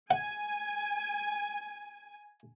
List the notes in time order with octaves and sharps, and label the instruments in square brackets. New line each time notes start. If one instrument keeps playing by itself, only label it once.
[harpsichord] F#5 [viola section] G#5